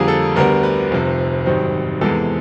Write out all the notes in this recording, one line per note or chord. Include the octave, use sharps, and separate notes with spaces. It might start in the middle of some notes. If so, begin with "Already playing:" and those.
Already playing: F2 D3 G3 A#3 G#4
A4
D2 D3 G3 B3 A#4
B4
F1 F2 C3
G#1 F#2 D#3 G3 C4
E2 C3 E3 G#3 B3 A4